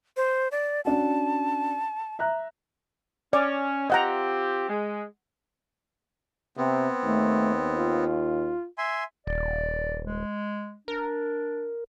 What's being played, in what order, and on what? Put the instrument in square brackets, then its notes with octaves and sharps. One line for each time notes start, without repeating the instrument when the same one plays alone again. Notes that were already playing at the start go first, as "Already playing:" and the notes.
[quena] C5
D5
[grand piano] C#4 D4 F#4 [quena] A5
[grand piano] E5 A#5 F#6
[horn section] C#4 [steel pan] D5
[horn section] C4 F4 G4 [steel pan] D#5 F#5 A#5
[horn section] G#3
[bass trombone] C3 [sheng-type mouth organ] B3 C4
[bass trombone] D#2 [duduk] A3
[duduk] F4
[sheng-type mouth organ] E5 G#5 C6
[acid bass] D#1 [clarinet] D5
[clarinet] G#3
[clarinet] D4 [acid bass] A#4